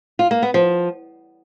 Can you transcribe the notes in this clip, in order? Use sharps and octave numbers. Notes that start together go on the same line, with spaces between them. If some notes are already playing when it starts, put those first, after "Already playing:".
F4
A#3
B3
F3